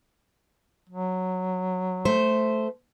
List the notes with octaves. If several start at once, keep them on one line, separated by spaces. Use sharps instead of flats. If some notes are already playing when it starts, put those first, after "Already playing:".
F#3
A3 C5